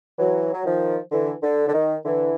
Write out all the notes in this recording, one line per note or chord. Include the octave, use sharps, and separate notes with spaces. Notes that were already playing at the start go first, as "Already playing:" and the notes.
E3 F#3
F#3
D#3 F3
D3 E3
D3
D3
D#3
D3 E3